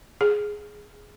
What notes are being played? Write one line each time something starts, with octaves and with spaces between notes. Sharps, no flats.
G#4